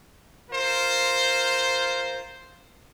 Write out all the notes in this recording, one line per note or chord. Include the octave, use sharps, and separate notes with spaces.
F4 A#4 C5